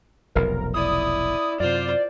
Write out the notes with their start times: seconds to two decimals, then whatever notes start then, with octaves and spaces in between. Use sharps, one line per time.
0.35 F1 B1 A#4
0.74 E4 D5 D#6
1.60 F#2 C3 F4 C5 D5